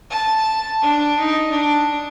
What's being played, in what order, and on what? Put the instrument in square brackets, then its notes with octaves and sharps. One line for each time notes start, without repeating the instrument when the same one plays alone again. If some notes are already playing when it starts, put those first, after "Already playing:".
[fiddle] A5
D4
D#4
D4